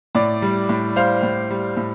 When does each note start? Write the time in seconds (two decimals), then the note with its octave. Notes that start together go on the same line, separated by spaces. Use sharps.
0.15 A2 D5
0.42 G3
0.69 A2
0.95 G3 C5 F5
1.23 A2
1.50 G3
1.77 A2